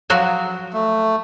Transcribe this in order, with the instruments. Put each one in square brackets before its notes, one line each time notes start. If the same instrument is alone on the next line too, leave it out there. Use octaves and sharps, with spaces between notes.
[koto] F3 F#3 F#4
[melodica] A3